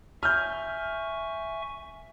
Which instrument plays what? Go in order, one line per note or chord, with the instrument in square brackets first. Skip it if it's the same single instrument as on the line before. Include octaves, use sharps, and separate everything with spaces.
[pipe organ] E5 G#5 C#6 [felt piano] F6 G6